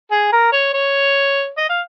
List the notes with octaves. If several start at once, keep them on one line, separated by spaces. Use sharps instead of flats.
G#4
A#4
C#5
C#5
D#5
F5